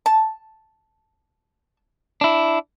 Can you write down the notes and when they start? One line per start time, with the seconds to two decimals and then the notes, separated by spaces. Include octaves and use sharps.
0.06 A5
2.21 D4 E4